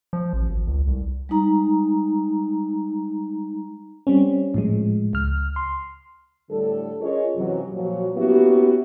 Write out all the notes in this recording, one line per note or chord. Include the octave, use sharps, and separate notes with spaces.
F3
A1
G#1
C#2
C2
G3 G#3 D#4 A#5
G3 C4 C#4
A2 F3 G#3
C#2 F6
C6
A2 D3 G3 A4
C#4 F4 G#4 A#4 C#5 D#5
F#2 C3 E3 F#3
A#2 F3 F#3
A#3 B3 C#4 E4 F#4 G4